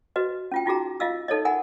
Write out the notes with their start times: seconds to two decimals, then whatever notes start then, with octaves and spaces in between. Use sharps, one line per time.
0.16 F#4 B4 D#5
0.52 C#4 F4 G5
0.66 D#4 F4 F#4 G#4 A#5
1.00 F4 D#5 F5 E6
1.28 D#4 A4 C#5 D#5
1.45 A#4 F#5 G#5 B5